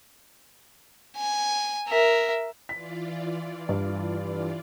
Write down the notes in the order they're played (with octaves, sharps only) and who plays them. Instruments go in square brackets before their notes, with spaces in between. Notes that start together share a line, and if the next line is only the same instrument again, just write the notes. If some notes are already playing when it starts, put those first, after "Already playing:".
[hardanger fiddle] G#5
A#4 E5
[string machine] E3 F4 D5 [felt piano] B6
[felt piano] G2